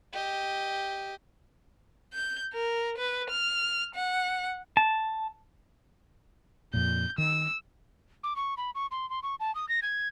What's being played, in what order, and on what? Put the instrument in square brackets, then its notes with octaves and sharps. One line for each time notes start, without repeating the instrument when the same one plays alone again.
[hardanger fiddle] G4 D#5
[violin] G6
A#4
B4
F6
F#5
[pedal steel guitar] A5
[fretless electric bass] F2 A#2 [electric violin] G6
[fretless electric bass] D#3 [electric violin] E6
[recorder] D6
C#6
B5
C#6
C6
C6
C#6
A5
D#6
A#6
G#6